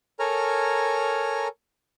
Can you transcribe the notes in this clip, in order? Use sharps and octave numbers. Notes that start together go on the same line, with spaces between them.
A4 A#4 C#5 G#5 A#5 F6